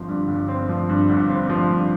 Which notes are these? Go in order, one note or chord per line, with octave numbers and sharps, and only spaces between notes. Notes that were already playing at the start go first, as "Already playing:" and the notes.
Already playing: G1 F3 C4
G2
G1
C4
F3
G2
G1
C4
F3
G2